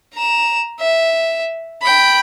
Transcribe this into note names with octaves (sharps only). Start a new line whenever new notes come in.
A#5 E7
E5
G5 B5